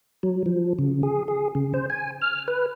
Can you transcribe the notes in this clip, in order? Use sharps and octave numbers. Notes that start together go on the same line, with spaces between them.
F#3
F3
C#3
G#4
G#4
C#3
C5
G#5
F6
B4